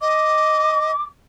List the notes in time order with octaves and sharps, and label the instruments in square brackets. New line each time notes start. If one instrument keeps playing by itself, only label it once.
[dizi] D#5 [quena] D6